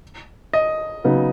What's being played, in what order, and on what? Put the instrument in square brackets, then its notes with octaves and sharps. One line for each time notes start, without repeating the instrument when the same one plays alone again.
[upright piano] D#5
[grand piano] C#3 F#3 B3 D#4